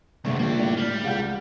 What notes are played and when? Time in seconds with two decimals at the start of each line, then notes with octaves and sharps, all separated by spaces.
0.25 F#1 D#2 D3 A3 E5
0.39 A#1 A#3 G5
0.59 A2 D5 F7
0.77 G3 F6
1.04 C#2 F#5 G6